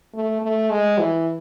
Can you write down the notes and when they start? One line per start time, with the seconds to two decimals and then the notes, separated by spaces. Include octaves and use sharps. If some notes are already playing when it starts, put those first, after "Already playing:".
0.14 A3
0.42 A3
0.70 G#3
0.98 E3